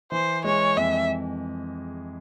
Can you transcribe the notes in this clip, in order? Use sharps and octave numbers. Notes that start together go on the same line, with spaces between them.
E3 C5
G#3 C#5
F2 E5